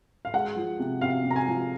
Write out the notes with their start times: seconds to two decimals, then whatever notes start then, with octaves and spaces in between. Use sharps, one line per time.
0.25 F5
0.34 G#3 F#5
0.56 F3
0.79 C3
1.01 C3 F5
1.24 C3
1.31 A#5
1.36 G#5
1.48 F3